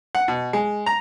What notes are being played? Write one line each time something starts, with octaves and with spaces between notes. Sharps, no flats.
F#5
B2
G#3
A#5